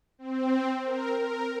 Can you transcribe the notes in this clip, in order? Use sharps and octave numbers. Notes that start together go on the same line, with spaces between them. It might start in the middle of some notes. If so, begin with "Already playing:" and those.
C4
A#4
A#4